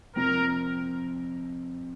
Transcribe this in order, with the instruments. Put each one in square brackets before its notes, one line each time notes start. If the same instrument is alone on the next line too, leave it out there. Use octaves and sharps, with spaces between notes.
[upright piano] F2 C3 F3 C4 [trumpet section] A#4